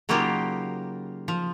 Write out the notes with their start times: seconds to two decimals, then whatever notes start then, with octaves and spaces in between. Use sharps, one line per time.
0.09 C#3 F#3 A#3 D#4 F4 G4
1.28 F3